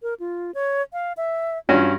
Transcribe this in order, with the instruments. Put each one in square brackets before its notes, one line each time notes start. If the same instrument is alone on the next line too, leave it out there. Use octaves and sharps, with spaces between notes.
[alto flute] A#4
F4
C#5
F5
E5
[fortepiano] G2 C#4 F#4 [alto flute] F4